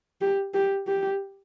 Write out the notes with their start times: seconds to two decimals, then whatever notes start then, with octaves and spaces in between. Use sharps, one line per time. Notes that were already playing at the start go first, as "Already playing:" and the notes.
0.21 G4
0.54 G4
0.87 G4